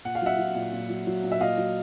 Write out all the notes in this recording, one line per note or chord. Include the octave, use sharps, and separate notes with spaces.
A#2 F#5
F5
F#3 E5 F#5
F#3
A#2
A#2
F#3
F#3
A#2
E5
A#2 D#5 F5
F#3